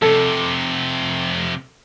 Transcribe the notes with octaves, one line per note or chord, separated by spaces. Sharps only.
F2 C3 A4